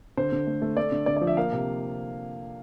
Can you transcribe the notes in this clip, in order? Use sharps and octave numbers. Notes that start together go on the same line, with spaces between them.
D3 C5
D3
A3
A3
A3 D5
D3
D3 D5
D5
F3
E5
A#3 F5
C3